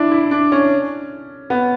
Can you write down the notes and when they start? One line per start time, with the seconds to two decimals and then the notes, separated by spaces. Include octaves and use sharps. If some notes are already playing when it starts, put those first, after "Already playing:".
Already playing: D4 E4
0.11 E4
0.31 D4
0.52 C#4
1.50 B3